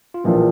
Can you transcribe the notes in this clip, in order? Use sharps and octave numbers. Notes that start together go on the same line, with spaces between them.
F4
A#1 A#2 E3 F3 E4